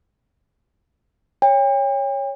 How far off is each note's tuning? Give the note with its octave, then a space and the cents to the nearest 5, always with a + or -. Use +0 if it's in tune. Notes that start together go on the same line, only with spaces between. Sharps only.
C#5 +0 G5 +40